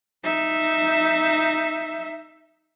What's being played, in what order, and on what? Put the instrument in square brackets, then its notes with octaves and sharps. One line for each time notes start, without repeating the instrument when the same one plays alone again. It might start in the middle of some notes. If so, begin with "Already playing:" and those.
[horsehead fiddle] D#4 E5